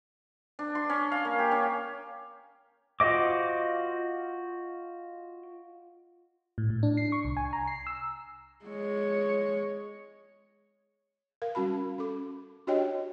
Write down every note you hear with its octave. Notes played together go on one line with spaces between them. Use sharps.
D4
C6
C#4
F5
A#3
G4
C#4
F4 F#4 C5 D#5 D6
A2
A2
D4
C7
C#6
C2
G#5
A#5
C7
E6
G#3 C#5
A#4 F5
G3 C#4 F#4 A5 B5
C#4 A4 D6
D4 F#4 G4 C#5 D#5 G5